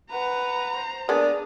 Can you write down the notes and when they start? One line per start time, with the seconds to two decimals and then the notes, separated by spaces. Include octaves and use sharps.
0.11 B4 F#5 A#5
0.75 C5
1.09 G#3 A#3 B3 D4 D#6